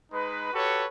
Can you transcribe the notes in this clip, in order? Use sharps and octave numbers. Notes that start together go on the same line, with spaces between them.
G#3 D#4 B4
F#4 G4 A4 B4 C#5